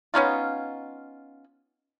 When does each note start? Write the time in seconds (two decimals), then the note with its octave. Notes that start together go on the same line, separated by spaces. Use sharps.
0.14 B3 C#4 D#4 F4